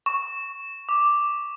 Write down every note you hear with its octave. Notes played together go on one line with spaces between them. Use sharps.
C#6
D6